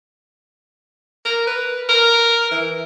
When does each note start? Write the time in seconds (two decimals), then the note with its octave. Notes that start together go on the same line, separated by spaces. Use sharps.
1.25 A#4
1.47 B4
1.89 A#4
2.51 E3